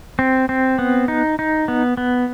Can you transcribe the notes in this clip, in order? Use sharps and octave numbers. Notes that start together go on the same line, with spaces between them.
C4
C4
B3
D#4
D#4
B3
B3